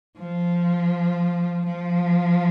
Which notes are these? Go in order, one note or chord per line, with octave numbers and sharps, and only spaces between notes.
F3
F3